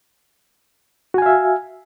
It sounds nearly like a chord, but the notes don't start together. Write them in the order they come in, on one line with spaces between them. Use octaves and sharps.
F#4 G#5 F5 E5